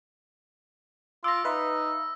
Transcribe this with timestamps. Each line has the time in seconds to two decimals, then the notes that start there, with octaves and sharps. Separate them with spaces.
1.24 F4 D6 E6 A#6
1.45 D#4 B4 E5 F5